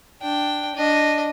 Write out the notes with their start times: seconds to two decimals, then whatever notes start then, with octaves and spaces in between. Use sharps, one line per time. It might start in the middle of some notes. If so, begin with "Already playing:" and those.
0.22 D4 G5
0.75 D4 D#5